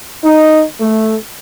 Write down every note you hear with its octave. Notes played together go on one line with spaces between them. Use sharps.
D#4
A3